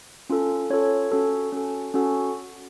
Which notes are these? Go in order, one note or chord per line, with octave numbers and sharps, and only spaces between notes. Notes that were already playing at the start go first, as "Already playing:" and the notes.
C#4 F4 A4
C#4 F4 A4 C#5
C#4 F#4 A4
C#4 F#4 A4
C#4 F#4 A4